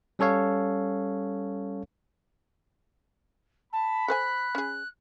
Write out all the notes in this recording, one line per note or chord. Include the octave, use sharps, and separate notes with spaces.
G3 C#4 A4 C#5 F5
A5 B5
A4 C5 G#5 F#6
C#4 G#4